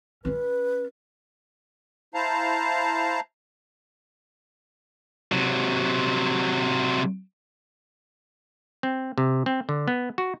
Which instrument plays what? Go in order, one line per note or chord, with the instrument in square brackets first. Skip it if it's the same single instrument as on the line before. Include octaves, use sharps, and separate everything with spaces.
[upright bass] C#4 F4 [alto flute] B4
[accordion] E4 C5 F5 A5 A#5
[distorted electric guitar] C3 F#3
[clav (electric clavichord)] C4
C3
C4
D3
B3
F#4